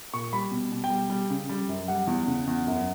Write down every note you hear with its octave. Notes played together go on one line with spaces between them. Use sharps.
A#2 C#6
G3 B5
B2
B2
G5
G3
G3
C#3
G3
F#2
G3 F#5
E2
C#3
E2
F#2